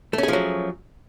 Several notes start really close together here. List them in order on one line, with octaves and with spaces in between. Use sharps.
A3 C#4 G#4 F3 F#3